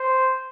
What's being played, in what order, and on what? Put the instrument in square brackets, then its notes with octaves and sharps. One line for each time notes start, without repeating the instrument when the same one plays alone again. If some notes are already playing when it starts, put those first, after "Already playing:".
Already playing: [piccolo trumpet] C5